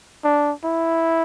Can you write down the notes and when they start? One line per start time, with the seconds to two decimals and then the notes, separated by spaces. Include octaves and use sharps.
0.24 D4
0.64 E4